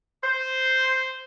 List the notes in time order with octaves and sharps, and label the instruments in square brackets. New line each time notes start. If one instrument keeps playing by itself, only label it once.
[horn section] C5